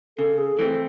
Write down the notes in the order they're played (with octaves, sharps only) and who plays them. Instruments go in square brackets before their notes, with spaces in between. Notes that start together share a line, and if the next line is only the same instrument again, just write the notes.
[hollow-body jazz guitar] C#3 [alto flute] A4
[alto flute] G#4
[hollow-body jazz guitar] E3 A3 C4 [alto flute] A4